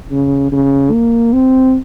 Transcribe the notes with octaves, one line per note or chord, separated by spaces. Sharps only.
C#3
C#3
A#3
C4